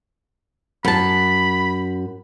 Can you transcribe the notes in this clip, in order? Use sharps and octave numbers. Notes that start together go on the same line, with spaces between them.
F#2 A5 B5